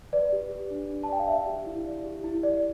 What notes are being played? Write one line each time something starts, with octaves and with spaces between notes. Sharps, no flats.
B4 D5
G4
G4
D4
D4
A5
D5 G5
F5
D5 E5
G4
E4
D5
G4
E4
D5